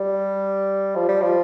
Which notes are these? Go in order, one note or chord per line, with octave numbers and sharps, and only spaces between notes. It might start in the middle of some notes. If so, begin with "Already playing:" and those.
Already playing: G3
F3
G3
F3